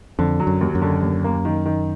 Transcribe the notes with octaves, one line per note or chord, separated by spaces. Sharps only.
F2 D3
F#3
F#2
D#2
F#2
D3
D#2
A#3
D#3
D#3